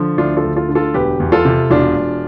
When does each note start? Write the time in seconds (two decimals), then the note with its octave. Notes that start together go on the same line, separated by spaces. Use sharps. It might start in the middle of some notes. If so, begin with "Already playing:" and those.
Already playing: D3 F3
0.17 D2 D4 F4
0.37 F4 A4
0.44 D2
0.56 F4 A4
0.69 D3
0.75 F4 A4
0.94 E1 G4 B4
1.20 E2
1.32 F4 A4
1.45 C3
1.70 E1 D4 F4
1.96 E1